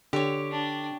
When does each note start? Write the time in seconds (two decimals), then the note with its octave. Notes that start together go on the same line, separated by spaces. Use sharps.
0.13 D3 G4 C#5
0.52 D4